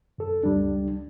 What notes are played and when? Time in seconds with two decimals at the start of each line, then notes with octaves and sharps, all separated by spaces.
0.18 F#2 A4
0.43 C#2 G3 D4